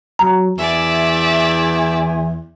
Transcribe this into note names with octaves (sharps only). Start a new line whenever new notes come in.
F#3 A#5
E2 D5 E5 G#5